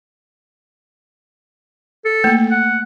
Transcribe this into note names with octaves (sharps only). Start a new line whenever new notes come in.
A4
A3 A#3
F#5